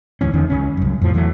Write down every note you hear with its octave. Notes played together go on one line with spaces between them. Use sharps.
D2 G#2 E3 C#4
E2 D3 D#3 C#4
C#2 C#3 C#4
C2 F#2
F2 A2 F3
E2 E3 F#3 A3